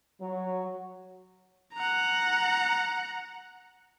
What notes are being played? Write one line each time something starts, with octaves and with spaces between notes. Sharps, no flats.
F#3
F#5 A#5